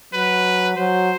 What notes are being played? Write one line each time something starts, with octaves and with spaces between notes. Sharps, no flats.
F#3 B4
F#3 C5